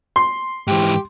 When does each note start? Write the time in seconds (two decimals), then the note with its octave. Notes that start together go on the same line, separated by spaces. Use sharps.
0.16 C6
0.67 G#2 E3 G4